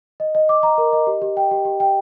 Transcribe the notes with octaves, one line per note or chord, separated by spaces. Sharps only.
D#5
D#5
D6
A#5
A#4
D#5
G4
G4
G5
G4
G4
G5